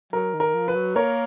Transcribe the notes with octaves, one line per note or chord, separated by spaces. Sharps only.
F#3 A#4
D#3
A#4
F3
B4
F#3
A#3 A#4 C#5